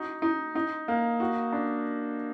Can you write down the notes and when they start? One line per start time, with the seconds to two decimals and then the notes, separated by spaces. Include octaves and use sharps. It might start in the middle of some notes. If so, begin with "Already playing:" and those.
Already playing: D#4 F#4
0.22 D#4
0.55 D#4
0.88 A#3
1.20 F#4
1.53 D4